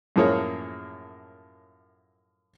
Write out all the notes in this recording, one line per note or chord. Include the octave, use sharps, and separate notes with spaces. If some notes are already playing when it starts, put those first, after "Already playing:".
F#2 A2 F3 A#3 G#4 C#5